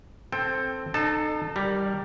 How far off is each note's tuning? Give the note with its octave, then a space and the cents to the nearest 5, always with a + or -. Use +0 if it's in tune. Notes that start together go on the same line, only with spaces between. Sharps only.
C4 +0 A4 +0 G5 +20
D#4 -35 A4 +0 A5 +0
G3 +0 A#4 +0